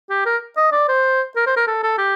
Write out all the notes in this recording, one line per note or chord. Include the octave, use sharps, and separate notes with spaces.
G4
A#4
D#5
D5
C5
A#4
C5
A#4
A4
A4
G4